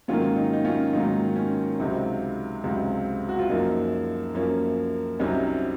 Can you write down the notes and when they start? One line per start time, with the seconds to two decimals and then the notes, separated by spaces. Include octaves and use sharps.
0.08 G#2 D#3 F#3 A#3 C#4 F4
0.36 D#4
0.53 D#4
0.65 C#4 F4
0.93 G#2 D#3 F#3 A#3 D#4
1.36 C#4
1.79 C#2 C3 F#3 C4 D#4
2.64 C#2 C3 F#3 C4
3.29 F#4
3.39 F4
3.49 F#2 F3 A#3 C#4 D#4
4.35 F#2 F3 A#3 C#4
5.19 C2 C3 F#3 C#4 D#4